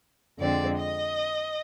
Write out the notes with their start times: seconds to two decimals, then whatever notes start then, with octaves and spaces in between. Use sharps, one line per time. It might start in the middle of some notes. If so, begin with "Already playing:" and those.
0.39 F2 D3 G#3 C4 D5
0.78 D#5